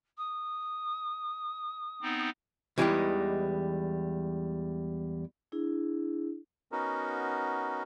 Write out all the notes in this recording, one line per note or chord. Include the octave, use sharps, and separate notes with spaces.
D#6
B3 C4 D#4
E2 E3 G3 G#3 D#4 G4
D4 E4 G#4
B3 C#4 D#4 F#4 A#4